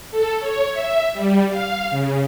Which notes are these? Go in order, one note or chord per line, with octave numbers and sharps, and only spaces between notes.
A4
C#5
E5
G3
F5
C#3